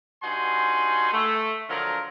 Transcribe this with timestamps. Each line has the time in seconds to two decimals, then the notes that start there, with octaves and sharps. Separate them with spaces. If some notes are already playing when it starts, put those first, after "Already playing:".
0.22 G2 D#4 F#4 G#5 C6
1.12 A3
1.69 D3 F3 F#3 A#4